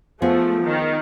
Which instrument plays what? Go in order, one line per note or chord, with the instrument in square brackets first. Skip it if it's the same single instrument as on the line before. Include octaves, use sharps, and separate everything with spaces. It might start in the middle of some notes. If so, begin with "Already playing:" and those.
[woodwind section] F3 [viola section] A3 [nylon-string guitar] B3 G#4
[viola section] D#3